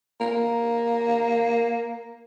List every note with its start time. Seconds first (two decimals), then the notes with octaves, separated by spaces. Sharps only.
0.20 A#3